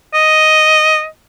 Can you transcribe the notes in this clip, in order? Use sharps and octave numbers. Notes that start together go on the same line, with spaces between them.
D#5